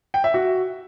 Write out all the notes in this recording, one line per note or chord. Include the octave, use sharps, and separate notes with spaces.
G5
E5
F#4